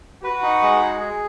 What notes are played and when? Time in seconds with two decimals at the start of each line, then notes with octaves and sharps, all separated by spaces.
0.24 F#4 B4
0.43 D#4
0.62 G#3
0.81 G#4
1.00 G#4